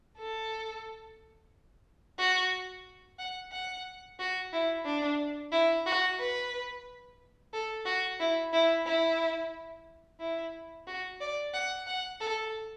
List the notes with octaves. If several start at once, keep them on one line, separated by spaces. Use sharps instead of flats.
A4
F#4
F#5
F#5
F#4
E4
D4
E4
F#4
B4
A4
F#4
E4
E4
E4
E4
F#4
D5
F#5
F#5
A4